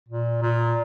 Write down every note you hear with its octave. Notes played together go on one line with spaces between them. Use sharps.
A#2
A#2